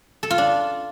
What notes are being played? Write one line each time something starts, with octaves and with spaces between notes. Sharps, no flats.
A4
F4
D4